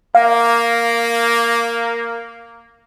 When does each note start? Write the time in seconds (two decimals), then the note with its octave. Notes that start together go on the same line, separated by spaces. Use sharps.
0.15 A#3 F5